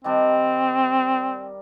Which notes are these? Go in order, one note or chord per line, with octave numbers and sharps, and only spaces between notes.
D#3 G3 C4 D4